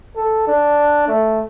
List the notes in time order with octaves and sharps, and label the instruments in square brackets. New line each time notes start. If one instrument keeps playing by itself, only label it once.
[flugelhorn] A4
D4
A3